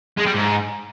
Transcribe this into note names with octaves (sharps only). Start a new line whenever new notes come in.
G#3
G3
G#2